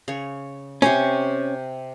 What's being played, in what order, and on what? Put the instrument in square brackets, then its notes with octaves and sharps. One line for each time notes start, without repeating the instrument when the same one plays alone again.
[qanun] C#3 C#5
[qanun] C3 C5 A#5 [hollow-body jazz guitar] C#4